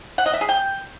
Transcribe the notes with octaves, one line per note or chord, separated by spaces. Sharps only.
F#5
D#5
E5
G#4
G5